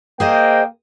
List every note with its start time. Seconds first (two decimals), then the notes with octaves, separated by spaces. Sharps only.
0.20 A#3 G#4 C5 D#5 G5